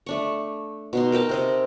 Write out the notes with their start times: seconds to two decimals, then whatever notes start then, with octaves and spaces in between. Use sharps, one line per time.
0.06 A3 D4 C#6
0.93 B2 D#4 C6
1.12 A#4 D#5 G5 A5
1.29 C3 C4 D#5